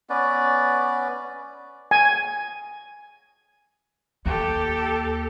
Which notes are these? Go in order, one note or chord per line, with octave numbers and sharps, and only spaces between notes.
B3 C#4 B4 D5
G#5
D#2 G4 A4